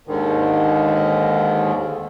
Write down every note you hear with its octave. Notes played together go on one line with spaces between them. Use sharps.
D#2 G#2 D3 D#3